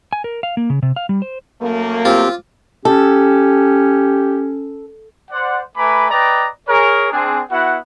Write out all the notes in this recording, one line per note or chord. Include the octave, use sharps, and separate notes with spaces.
G#5
A#4
F5
A#3
C#3
C3
F5
G3
C5
F#2 A3 A#3
C4 F4 G4
C#4 G4 A4
C5 D5 F#5
A3 B4 G#5 A#5 B5 D6
B4 D5 D#5 G5 A#5
G#4 A#4 C#5
C4 D4 G#4
B3 E4 F#4 F#5